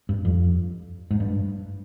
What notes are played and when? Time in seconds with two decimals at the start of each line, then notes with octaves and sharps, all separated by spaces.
0.09 G2
0.25 F2
1.11 G#2
1.20 G2